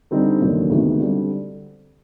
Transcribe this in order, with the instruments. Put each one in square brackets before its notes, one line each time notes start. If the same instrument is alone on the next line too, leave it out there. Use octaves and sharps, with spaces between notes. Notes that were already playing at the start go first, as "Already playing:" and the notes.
[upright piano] D3 G3 C4 D#4
F1 D#2 D3 F#3
D2 C3 D#3 G#3 B3
D3 G3 C4